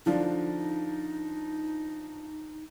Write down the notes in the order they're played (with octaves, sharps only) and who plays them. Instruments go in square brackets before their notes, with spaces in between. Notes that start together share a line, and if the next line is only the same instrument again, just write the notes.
[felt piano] D3 F3 D4 [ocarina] D#4